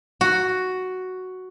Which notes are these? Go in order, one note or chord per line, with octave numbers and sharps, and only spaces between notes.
F#4